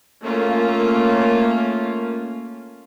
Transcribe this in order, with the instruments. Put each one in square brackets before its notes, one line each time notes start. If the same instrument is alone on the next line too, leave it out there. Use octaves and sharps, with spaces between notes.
[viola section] A3 A#3 C#4 F4